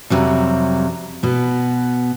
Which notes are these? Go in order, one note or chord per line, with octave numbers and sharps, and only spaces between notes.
F2 C3 F#3 G3
B2 B3